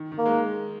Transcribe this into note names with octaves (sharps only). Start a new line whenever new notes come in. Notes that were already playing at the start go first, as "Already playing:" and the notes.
Already playing: D#3
D#3
A#3
G#3